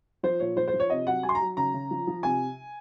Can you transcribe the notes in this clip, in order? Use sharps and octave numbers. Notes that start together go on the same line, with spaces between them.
F3 C5
A#2 C#5
F3 C5
C5
F3
C#5
C3 D#5
F#3 F#5
F#3 G#5
C6
A#5
F#3
C#3 A#5
C#3
F3
F3
C3 G#5